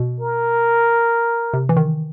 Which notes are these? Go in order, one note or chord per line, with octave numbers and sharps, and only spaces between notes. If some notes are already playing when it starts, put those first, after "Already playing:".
Already playing: B2
A#4
C3
E3
D#3